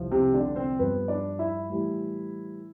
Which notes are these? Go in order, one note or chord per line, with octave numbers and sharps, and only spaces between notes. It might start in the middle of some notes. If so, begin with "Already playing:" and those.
Already playing: C2 F3
C3 C4
D3 D4
C4 C5
G2 F3 B3 B4
D4 D5
E4 E5
A2 E3 G3